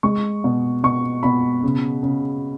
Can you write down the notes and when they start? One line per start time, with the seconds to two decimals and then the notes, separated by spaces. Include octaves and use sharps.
0.03 G#3 C#6
0.44 B2
0.84 B2 C#6
1.23 B2 B5
1.63 C#3
2.03 C#3